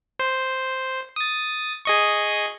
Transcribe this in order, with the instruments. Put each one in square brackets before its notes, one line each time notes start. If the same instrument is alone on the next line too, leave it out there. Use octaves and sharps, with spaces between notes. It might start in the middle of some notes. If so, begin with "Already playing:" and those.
[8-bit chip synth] C5
D#6 A6
G#4 D#5 C#6